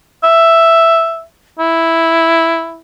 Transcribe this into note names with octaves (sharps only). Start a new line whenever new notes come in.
E5
E4